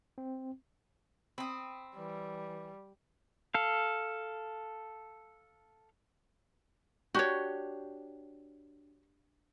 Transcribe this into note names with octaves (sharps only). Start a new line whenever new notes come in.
C4
C4 B5 D#6
E3 G3
A4 F5
D4 F#4 G4 C#5